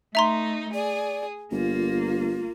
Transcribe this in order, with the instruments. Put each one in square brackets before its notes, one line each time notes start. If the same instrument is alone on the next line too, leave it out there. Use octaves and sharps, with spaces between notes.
[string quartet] A3 D#4 [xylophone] E5 A#5 C6
[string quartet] G#4 [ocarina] D5
[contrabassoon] G1 [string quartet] A#3 [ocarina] F4